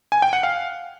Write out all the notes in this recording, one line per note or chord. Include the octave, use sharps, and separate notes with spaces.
G#5
G5
F#5
F5